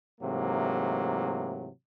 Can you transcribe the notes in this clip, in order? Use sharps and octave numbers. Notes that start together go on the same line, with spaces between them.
G#2 C3 E3 F#3 A3 A#3